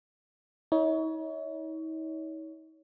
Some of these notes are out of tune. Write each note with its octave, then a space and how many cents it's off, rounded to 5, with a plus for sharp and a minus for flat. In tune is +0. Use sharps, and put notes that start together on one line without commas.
D#4 +45 C#5 +25